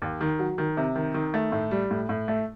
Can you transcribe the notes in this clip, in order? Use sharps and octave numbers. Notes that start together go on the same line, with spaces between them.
D#2
D#3
F#3
D#3
C3
D#3
D#3
A3
A2
G3
A2
A2
A3